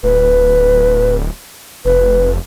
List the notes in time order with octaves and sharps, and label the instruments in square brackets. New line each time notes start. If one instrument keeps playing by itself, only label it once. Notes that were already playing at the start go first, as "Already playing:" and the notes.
[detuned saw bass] D1 [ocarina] B4
[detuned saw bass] F1 [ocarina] B4